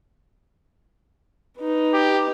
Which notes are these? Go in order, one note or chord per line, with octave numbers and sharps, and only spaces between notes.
D#4 B4
G4